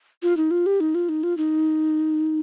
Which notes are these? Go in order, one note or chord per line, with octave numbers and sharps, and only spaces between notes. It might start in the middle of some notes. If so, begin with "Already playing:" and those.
F4
D#4
F4
G4
D#4
F4
D#4
F4
D#4